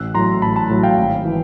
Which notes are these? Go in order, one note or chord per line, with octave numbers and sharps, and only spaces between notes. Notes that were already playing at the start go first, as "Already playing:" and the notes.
Already playing: A1 E6 F#6
A2 F#3 A#5 C6
A1 A5 B5
A5 B5
A2 F#3
F5 G5
G#1
E3